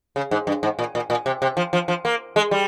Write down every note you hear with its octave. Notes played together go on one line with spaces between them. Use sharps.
C#3
G#2
G2
G#2
A#2
A#2
A#2
C3
C3
F3
F3
F3
A#3
G#3
G3